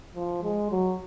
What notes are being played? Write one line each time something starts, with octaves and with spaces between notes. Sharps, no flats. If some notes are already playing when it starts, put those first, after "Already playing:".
F3
G#3
F#3